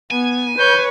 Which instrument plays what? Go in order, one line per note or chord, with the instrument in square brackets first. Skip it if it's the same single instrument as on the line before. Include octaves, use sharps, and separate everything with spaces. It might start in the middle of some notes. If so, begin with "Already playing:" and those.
[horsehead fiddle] B3 [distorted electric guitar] G#5
[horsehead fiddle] B4 [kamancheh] C#5 [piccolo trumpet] G6